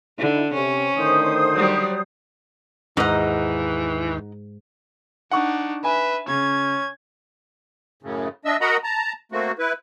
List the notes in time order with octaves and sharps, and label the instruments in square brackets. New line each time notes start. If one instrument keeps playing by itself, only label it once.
[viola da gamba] D3 [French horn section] D#4 E4
[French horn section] C3 [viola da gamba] C#4
[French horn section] A2 D3 D#3 [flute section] C5 D#6
[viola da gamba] F#3 G3
[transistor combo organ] D#2 [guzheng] G#2 A#5 [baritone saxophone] E3 [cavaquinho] D#4 D#5 F#5
[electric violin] D4 D#4 [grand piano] F#5 C#6
[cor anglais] B4 [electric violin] E5 [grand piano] G#5
[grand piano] C#3 [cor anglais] C#4 [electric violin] G#6
[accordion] F#2 A2 C#3
D4 D#5 E5 E6
F#4 A#4 D#5 F#5 A#5 B5
A5 A#5
A3 A#3 C4 F#4
E4 B4